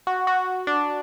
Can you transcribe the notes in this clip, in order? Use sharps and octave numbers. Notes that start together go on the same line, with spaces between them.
F#4
F#4
D4